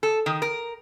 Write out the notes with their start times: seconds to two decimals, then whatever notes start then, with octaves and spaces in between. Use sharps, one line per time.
0.03 A4
0.26 D#3
0.42 A#4